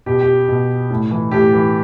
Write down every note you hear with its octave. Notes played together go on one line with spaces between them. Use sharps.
B2 G4
G4
B2
A2
E3
A2 G4
E3